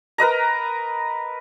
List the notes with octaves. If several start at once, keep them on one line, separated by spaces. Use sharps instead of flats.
A#4 B4 D#5 A#5